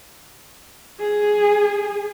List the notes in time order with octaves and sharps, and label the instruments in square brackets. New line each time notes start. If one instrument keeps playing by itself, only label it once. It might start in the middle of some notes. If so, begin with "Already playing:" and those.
[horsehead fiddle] G#4